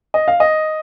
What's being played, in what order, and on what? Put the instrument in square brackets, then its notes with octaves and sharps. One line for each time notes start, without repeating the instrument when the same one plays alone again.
[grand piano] D#5
F5
D#5